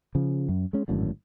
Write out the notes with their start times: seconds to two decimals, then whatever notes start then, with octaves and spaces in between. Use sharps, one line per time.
0.15 C#3 F3
0.49 F#2
0.73 G#3 C#4
0.88 G#1 F#2 A2 D3